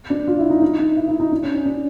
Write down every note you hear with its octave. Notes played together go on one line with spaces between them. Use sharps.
D4
F4
E4
D#4
D#4
D#4
E4
E4
D#4
D4
C#4
C#4
D4